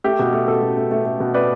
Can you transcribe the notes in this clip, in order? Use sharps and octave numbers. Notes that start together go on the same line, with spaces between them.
A3 G4
B2
A3
B2 A4
B2
A3
A3
A3
B2
A3 B4 D5